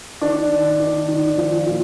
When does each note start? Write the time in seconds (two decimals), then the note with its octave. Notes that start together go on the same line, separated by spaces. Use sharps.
0.21 D#3 D4
0.51 D#3
0.80 D#3
1.08 D#3
1.38 F3
1.66 A#2